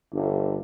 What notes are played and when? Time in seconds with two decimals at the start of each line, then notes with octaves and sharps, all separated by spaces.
0.13 G1